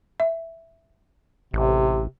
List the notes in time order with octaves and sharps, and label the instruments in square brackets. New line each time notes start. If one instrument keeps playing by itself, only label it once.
[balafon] E5
[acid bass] A1 [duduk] C3